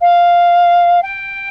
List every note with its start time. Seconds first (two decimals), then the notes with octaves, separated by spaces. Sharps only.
0.01 F5
1.03 G5